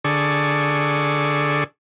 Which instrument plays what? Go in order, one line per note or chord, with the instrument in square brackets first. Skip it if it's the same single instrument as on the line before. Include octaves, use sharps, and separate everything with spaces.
[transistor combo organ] D3 G#4 A4 D5 C#6